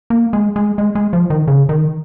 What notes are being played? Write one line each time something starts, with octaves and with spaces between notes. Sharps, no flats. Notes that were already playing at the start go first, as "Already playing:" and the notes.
A#3
G#3
G#3
G#3
G#3
F3
D#3
C#3
D#3